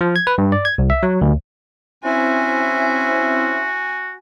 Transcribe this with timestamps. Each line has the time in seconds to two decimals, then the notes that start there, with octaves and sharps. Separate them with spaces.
0.01 F3
0.16 G#6
0.27 B4
0.38 G2
0.52 D5
0.65 G#6
0.78 C2
0.90 E5
1.03 F#3
1.22 D2
2.04 C4 C#4 E4 F#4 C5 E5 G#5